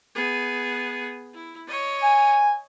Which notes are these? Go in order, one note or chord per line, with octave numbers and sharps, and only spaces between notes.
B3 G#4
E4
C#5 D#5
G#5